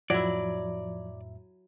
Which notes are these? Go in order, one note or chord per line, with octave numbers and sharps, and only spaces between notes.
F2 A2 F3 F#3 E4 D5 E5